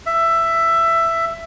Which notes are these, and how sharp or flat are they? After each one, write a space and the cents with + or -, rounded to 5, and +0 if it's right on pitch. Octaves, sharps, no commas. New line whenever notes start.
E5 +10